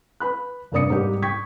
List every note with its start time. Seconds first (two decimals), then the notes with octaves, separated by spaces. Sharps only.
0.20 B4 B5 F#6
0.72 F1 G2 A#3 D5 D#6 C#7
0.90 G#2 G3 G4
1.22 G5 C#6 G#6 B6